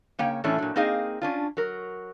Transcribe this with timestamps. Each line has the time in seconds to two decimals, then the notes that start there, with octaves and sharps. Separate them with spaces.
0.19 C#3 A#3 C#5 G5
0.44 A2 E3 A3 C#4 D4
0.58 A#2 F#3
0.76 A#3 C4 D#4 G#4 D#5 F5
1.22 C#4 D4 F4
1.57 F#3 A#4